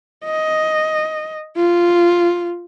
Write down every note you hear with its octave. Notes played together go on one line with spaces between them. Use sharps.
D#5
F4